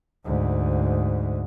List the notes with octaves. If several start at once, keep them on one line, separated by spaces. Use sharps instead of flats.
D2 G#2